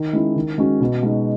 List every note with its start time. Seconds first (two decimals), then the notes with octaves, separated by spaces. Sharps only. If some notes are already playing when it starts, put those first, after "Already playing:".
Already playing: D#3
0.13 G#3 C#4 E4
0.36 D#3
0.58 G#3 C#4 F#4
0.80 B2
1.03 G#3 D#4 F#4